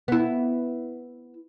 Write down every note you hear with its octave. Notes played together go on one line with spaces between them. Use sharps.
B3 E4